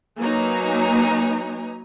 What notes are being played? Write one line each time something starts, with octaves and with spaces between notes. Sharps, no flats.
F#3 A#3 D#4 B4 G#5 A#5